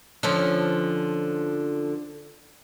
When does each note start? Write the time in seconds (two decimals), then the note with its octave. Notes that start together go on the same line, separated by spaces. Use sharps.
0.23 D3 F3 C#4